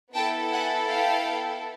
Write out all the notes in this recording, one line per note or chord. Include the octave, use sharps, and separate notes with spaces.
B3 E4 A4 G5 A5
F#5 G#5
F5 G5